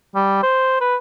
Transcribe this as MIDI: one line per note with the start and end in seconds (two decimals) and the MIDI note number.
0.15 0.43 55
0.43 0.77 72
0.81 0.96 71